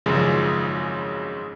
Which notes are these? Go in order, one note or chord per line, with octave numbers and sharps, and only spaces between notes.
G#1 F#2 C#3 F3 G#3 G#4